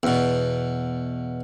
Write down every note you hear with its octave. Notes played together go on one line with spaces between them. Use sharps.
E2 B2